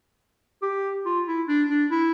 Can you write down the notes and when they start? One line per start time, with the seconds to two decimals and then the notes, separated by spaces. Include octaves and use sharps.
0.62 G4
1.06 F4
1.27 E4
1.48 D4
1.70 D4
1.91 E4